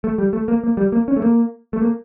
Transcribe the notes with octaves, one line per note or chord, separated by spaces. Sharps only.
A3
G3
A3
A#3
A#3
G3
A#3
C#4
A3
A#3
A3
A#3